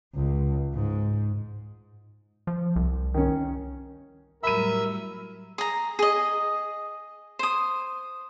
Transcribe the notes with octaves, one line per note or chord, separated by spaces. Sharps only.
C#2
G#2
F3
C2
D#3 C#4
A2 F#3 G3 A#4 E5 B5 E6 D#7
G#4 A#5
G#4 D#5
C5 D#6